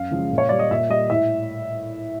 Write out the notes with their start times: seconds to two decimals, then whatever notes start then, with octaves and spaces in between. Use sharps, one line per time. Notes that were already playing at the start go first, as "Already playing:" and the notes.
Already playing: F#2 F5
0.11 C#3 F3 G#3
0.31 A#2
0.38 C#5
0.49 G3 D5
0.59 D#5
0.71 A#2 E5
0.90 G3 D#5
1.10 A2 E5